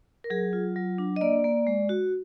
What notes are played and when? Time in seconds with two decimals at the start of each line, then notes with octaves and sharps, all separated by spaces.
0.24 A#4
0.30 F#3 G#4
0.53 F4
0.76 F#3
0.98 D4
1.16 D#5
1.21 A#3 D5
1.44 A#3
1.67 G#3
1.89 F#4